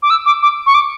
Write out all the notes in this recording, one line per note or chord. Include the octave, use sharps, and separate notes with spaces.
D6
E6
D6
D6
C#6
D6